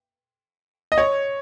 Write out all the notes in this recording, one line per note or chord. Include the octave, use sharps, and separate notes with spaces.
D#5
C#5